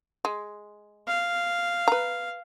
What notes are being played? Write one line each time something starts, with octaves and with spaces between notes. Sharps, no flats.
G#3
F5
B4 A#5